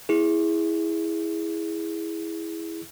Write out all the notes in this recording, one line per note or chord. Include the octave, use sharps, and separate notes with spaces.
E4 G#4